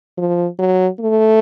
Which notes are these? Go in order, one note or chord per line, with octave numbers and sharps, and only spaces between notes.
F3
F#3
A3